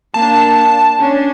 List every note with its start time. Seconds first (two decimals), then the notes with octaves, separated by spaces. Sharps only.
0.14 A#3 D4 A5
0.99 C#4 D4